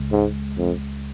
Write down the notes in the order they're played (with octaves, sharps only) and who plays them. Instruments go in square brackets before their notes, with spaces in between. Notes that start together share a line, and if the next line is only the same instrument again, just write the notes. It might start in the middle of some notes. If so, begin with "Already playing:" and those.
Already playing: [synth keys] C#2 C#3 G#3
[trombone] G#2
F2